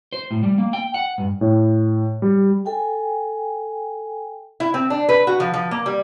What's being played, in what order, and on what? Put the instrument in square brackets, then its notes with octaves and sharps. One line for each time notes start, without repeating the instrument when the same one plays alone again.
[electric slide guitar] C5
A2
G3
A#3
G5
F#5
G2
[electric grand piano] A2
G3
[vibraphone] A4 G5 G#5
[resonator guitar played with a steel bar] E4
C4
D4
B4
F#4
F3
F3
A#3
G3